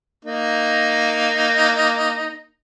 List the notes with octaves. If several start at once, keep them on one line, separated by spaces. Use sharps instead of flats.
A#3 D#4